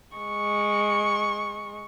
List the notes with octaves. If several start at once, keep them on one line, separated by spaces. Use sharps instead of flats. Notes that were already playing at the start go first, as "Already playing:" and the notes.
G#3 C#6